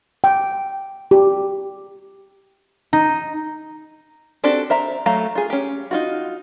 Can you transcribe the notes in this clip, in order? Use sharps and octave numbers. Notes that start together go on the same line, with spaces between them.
G5
G4
D#4
C4 D4 F#4 G4 A4
C5 E5 A#5
F#3 A3 F5 A#5
F4 G#4
C#4 G4
D#4 F4 F#4